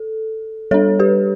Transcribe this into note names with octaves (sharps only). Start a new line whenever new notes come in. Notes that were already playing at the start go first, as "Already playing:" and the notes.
Already playing: A4
G3 D4 A4 C#5
G4 B4